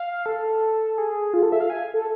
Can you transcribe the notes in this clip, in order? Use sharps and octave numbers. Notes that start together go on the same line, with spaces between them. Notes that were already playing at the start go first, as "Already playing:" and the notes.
Already playing: F5
A4
G#4
F4
A4
E5
F5
G#5
A4